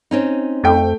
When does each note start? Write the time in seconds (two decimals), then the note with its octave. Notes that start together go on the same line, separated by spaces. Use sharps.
0.11 C4 C#4 D#4
0.64 F2 A3 G5